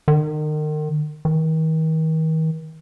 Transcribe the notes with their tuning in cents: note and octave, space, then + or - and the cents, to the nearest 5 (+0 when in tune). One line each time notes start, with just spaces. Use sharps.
D#3 -35
D#3 +40